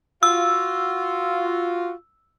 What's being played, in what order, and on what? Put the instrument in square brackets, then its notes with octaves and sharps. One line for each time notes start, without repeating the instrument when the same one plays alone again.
[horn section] F4 F#4 [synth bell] E6